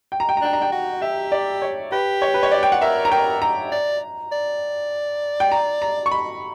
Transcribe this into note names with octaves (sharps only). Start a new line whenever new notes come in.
G5
A#5
G5
A#5
D4 G5
A#5
G5
F#4
G4 E5
D5
C#5
G4 B4
C#5
B4
C#5
D5
G5
F#5
A#4 E5
A#5
A#4 G5
A#5
D5
D5
G5
A#5
A#5
C#6
B5